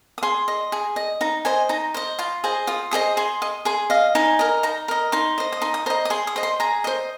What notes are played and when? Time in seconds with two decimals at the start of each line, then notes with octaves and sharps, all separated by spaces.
0.18 D#6
0.23 G#4 C6
0.48 D#5
0.72 G#4
0.96 D#5
1.21 D#4 A#5
1.45 C5 D#5 G#5
1.69 D#4 A#5
1.94 C5 D#5
2.19 F4 C6
2.44 G#4 C5 D#5
2.67 F4 D#6
2.91 G#4 C5 D#5 D#6
3.17 G#4 C6
3.42 D#5
3.65 G#4 C6
3.90 D#5 F5
4.15 D#4 G#5
4.39 A#4 D#5
4.63 D#4 A#5
4.88 A#4 D#5
5.12 D#4 C6
5.38 C5 D#5
5.52 D#6
5.62 D#4 C6
5.74 D#6
5.86 C5 A#5
5.90 D#5
6.05 D#6
6.10 G#4 C6
6.27 D#6
6.36 C5 D#5
6.43 C6
6.60 G#4 A#5
6.84 C5 D#5